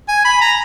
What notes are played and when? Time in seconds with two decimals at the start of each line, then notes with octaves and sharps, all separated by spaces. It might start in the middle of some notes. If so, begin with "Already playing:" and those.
0.08 G#5
0.25 B5
0.41 A#5